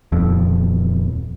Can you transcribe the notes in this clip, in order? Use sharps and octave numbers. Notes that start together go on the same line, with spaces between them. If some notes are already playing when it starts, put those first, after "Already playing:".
D#1 F2